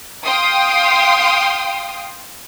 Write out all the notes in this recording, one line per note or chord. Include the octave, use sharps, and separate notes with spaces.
F5 G5 C6 D#6